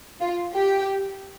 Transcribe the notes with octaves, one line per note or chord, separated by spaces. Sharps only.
F4
G4